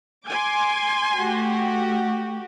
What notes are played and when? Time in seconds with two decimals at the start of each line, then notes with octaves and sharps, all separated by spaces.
0.29 G#5 C6 D6
1.14 A3 F#4 G4